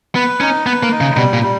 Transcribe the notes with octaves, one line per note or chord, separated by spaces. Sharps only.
B3 B4
C#4 D#4
B3 B4
A#3
D#4
C#3
B2 G3
A#2
G3